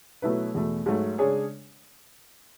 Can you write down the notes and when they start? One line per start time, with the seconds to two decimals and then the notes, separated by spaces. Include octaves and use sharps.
0.22 B2 F#3 A3 E4 B4
0.54 E2 B2 A3
0.86 G#2 F#3 A3
1.18 C#3 G#3 D4 G#4 C#5